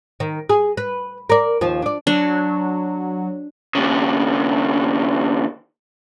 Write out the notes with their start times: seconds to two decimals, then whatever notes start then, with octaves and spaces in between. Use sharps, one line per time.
0.20 D#3
0.49 G#4
0.77 B4
1.30 A#4 D5
1.61 D#2 F3
1.82 D4 D5
2.07 F#3 D4
3.75 D#2 C#3